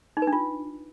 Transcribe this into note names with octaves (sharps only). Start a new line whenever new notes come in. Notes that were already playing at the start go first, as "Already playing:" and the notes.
D#4
B4
D4
F4